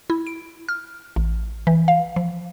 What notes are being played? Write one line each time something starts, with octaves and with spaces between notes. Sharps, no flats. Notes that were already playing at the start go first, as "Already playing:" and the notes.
E4
D7
F6
A1
E3
F5
F3